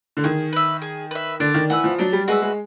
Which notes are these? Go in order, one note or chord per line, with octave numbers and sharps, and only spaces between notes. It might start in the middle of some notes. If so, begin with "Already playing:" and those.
D3
D#3 G#4
B4 E5
G#4
B4 E5
D3 D4
D#3
E3 F#4 B4 E5
F3
F#3 D4
G3
G#3 F#4 B4 E5
G#3